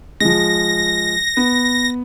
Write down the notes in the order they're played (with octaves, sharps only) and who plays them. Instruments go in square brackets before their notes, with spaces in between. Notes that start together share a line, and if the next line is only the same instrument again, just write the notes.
[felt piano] F3 G#3 [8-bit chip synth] A#6
[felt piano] B3